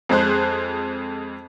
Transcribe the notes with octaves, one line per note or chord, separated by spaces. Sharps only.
F2 G#3 G#4 C5 F#6